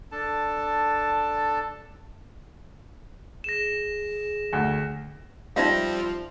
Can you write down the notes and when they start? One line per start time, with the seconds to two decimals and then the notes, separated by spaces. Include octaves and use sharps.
0.12 D4 A4 A5
3.44 G#4 A#6 E7
4.53 D2
5.56 F3 G3 C4 D#4 E5 F5